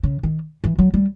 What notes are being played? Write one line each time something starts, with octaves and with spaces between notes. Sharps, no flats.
C#3
D#3
E3
F#3
G3